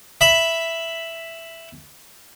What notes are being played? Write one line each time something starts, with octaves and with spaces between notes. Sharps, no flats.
E5 B5